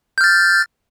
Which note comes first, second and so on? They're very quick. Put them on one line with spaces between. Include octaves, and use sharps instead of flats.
G6 F6 A6